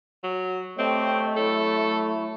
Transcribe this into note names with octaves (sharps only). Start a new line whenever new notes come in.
F#3
A3 C4 G4 C#5 D#5
F#3 E4 A4 C#5